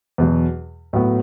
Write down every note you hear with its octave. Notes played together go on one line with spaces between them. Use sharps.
E2 B2 F#3
A2 F#3 B3